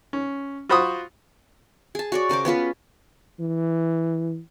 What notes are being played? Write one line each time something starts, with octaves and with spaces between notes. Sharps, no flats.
C#4
F4 F#4 C5 B5 C#6 D#6
G#4 A5
F#4 C#5 D5
C#3 A#4 C5 D6
B3 C#4 F4 B4
E3